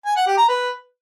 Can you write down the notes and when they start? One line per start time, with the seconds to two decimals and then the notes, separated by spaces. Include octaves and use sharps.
0.06 G#5
0.16 F#5
0.27 G4
0.37 A#5
0.48 B4